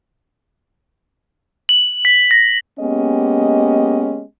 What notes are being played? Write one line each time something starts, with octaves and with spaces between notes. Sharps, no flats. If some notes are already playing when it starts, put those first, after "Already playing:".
F#7
B6
A#6
G#3 A#3 B3 C#4 G4 D#5